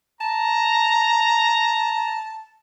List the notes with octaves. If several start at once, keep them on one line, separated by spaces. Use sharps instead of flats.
A5 A#5